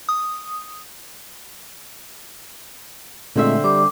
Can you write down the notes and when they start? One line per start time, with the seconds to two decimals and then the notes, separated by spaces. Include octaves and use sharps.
0.09 D#6
3.36 A#2 D3 G#3 A3 C4 E5
3.64 G3 D6